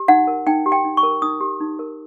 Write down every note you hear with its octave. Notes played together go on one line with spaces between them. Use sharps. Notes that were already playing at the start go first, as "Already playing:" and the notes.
Already playing: G4
D#4 F#5
A#4
D#4 G5
G4
G5
D#4
C#6
A#4
D#4 D#6
G4
D#4
A#4